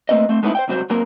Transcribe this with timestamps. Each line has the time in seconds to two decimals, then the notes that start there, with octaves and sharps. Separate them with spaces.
0.09 A3 A#3 C4 B4 D#5
0.29 A3 C4
0.43 G#3 A3 B3 C4 D#4 E4
0.55 C5 E5 G5
0.68 C#2 G2 C3 F#3 F#4 C5
0.90 F#2 F#3 A#3 C4 A#4